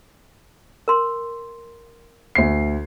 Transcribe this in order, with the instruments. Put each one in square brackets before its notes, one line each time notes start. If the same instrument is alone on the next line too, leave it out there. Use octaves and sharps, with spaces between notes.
[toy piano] A#4 C6
[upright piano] D2 C7